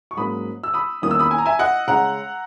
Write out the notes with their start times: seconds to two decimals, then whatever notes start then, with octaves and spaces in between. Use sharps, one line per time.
0.11 C#6
0.17 G#2 F#3 A#3 C#4 B5 D#6
0.64 E6
0.74 B5 D#6
1.02 E2 D#3 A#3 C#4 D#6
1.11 E6
1.19 B5 D#6
1.31 G#5
1.38 A#5
1.46 E5 G#5
1.59 D#5 F#5
1.87 C#3 G#3 C#4 F#5 A#5